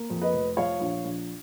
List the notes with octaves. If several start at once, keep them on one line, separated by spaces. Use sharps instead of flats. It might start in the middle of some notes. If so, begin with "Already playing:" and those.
Already playing: A#3
F2
B4 D#5
F1
F3 C#5 F5
A#1
A#1